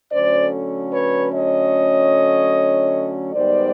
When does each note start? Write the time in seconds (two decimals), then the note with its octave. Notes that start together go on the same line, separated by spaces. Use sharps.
0.12 D3 F#3 A3 C#4 C5 D5
0.93 B4 C#5
1.32 C#5 D#5
3.33 G#2 D#3 G3 B3 C5 D5